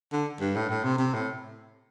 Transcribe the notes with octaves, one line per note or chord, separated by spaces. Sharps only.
D3
G2
A2
A2
C3
C3
A2